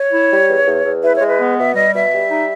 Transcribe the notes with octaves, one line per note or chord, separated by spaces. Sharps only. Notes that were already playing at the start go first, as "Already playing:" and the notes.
Already playing: C#5
E4
G3
E2
E2
E2
E4 B4
C#5
G#3
B4
B3
B2 E5
G3 D#5
B2 E5
G3
D#4